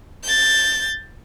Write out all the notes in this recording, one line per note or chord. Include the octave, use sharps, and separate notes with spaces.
G6 A6